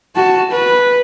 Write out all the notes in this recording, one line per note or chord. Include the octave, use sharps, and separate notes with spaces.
F#4 A5
B4